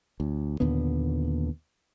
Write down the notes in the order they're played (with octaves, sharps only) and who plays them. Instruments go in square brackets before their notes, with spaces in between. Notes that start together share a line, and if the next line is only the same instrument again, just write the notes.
[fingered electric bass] D2
D#2 A#2 D3 B3